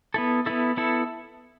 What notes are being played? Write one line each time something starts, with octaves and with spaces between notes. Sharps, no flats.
B3 E4 A4
B3 E4 A4
B3 E4 A4